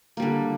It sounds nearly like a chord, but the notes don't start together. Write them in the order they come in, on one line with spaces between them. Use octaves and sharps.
A#3 G3 D3